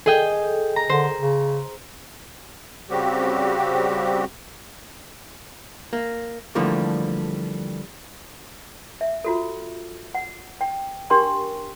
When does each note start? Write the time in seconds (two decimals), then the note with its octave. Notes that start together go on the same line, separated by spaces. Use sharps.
0.06 G#4 A4 D#5 G5
0.76 A#5
0.89 D3 C5
1.18 C#3
2.90 C#3 G3 C4 F#4 G4
5.93 A#3
6.55 D3 E3 F3 G3 A3 A#3
9.01 E5
9.24 F4 F#4 A4
10.15 F#5
10.61 G5
11.10 D4 G4 A#4 G5 C6 C#6